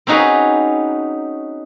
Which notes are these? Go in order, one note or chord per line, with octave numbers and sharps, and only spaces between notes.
C4 C#4 D#4 F#4 G#4 B4